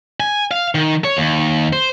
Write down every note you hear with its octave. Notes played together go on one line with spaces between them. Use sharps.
G#5
F5
D#3
C#5
D#2
C5